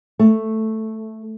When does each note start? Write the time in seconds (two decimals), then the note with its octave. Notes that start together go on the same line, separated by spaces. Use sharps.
0.19 A3